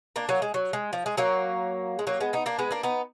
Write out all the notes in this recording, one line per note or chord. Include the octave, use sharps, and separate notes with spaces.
A#3 D4
F#3 A#3
G#3
F#3
G#3
F3
G#3
F#3 A#3
G#3
F#3 A#3
G#3 B3
B3 D#4
A#3 D4
G#3 B3
A#3 D4
B3 D#4